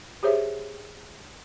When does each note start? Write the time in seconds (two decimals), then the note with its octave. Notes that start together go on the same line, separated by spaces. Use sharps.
0.23 G4 G#4 C5 C#5 E5